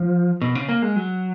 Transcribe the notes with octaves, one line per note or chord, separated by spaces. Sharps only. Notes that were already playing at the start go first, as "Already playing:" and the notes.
Already playing: F3
B2
C#3
A#3
G#3
F#3